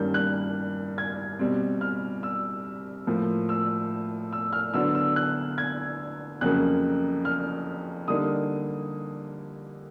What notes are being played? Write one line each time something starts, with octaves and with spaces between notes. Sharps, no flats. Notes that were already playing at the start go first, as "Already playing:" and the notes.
Already playing: G2 D#3 G3 A#3 C#4 G6
F#6
G#6
B2 G3 C4
F6
E6
A2 F3 A#3
E6
E6
F6
D3 F#3 B3 D4 E6
E6
F#6
G#6
F2 C#3 F#3 A#3 C#4 F#6
F6
D3 G3 A#3 D#4 D#6